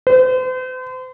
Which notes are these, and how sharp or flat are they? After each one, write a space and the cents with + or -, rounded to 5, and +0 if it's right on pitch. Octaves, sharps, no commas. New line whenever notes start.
C5 -40